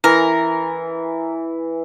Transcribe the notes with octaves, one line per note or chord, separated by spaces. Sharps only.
E3 A#4